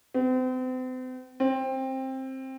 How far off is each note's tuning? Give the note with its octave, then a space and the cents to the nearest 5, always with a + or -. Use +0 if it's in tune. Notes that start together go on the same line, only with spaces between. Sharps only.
C4 -40
C4 +15